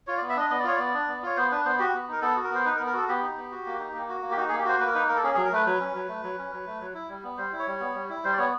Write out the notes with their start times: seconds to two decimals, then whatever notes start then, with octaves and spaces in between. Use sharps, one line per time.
0.07 F4 C#5
0.18 D5
0.22 B3
0.29 E5
0.36 D4 D#5
0.50 B3 D#5
0.59 D5
0.64 F4 C#5
0.76 B3 D5
0.94 D4
1.08 B3
1.23 F4 C#5
1.37 B3 C5
1.51 D4 B4
1.65 B3 C5
1.79 F#4 G4
1.94 B3
2.08 D#4 A#4
2.22 B3 A4
2.36 F#4
2.44 A#4
2.50 B3 C5
2.65 D#4 B4
2.76 A#4
2.80 B3
2.86 A#4
2.93 F#4 A4
3.08 B3 G4
3.22 D#4
3.37 B3
3.52 F#4
3.66 A#3
3.79 D#4
3.94 A#3
4.09 F#4
4.22 A#3
4.31 G4
4.36 D#4 F#4
4.48 G#4
4.52 A#3
4.58 G4
4.65 F#4 C5
4.80 A#3 B4
4.87 A#4
4.94 D#4 B4
5.08 A#3 A#4
5.16 A4
5.23 C#4 G#4
5.34 F#3 G#4
5.45 A#4
5.52 A3 B4
5.66 F#3 B4
5.80 C#4
5.95 F#3
6.08 A3
6.23 F#3
6.38 C#4
6.52 F#3
6.67 A3
6.80 F#3
6.94 E4
7.09 G3
7.23 B3
7.37 G3 C5
7.52 E4
7.59 C#5
7.67 G3
7.80 B3
7.94 G3
8.09 E4
8.24 G3 C5
8.33 D5
8.37 B3 C#5